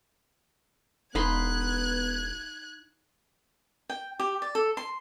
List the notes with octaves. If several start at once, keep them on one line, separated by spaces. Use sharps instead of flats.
E1 B3 D#4 B5 C6 F#6 G#6
G5
G4
D5
A4
C6